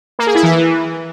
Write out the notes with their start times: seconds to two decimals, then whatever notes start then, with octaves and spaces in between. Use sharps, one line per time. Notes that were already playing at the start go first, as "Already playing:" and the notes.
0.19 A#3
0.27 G#4
0.35 E4
0.43 E3